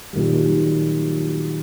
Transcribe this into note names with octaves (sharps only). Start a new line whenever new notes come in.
A#2 D#3 F#3 G3